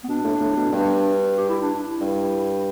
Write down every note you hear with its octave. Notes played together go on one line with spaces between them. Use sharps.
B3
B2 D4
A2
A2
B2
G2
G4
E4
D4
E4
G2